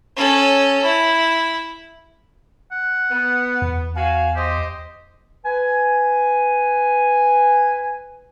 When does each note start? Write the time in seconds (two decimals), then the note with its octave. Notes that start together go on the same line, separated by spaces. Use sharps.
0.16 C#4 A4
0.84 E4
2.72 F#5
3.10 B3
3.62 E2
3.96 F#4 F5 G#5
4.36 G4 C5 D#5
5.44 B4 G#5